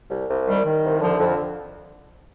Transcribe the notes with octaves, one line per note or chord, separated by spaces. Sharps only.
C2
C2
D#3 G3
D#3
C2
D3 F3
F2